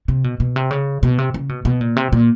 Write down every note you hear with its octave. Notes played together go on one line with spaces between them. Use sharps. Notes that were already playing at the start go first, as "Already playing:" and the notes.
C3
B2
B2
C3
C#3
B2
C3
C#3
B2
B2
A#2
C3
A#2